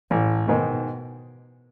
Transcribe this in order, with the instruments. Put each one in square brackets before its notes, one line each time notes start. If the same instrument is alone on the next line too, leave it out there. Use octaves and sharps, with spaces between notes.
[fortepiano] A1 [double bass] A2
[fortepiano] G#2 D#3 [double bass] B2